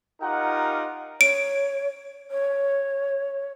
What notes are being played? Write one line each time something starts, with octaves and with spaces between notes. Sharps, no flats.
D#4 F4 G4 A#4 F#5
C#5 D7
C#5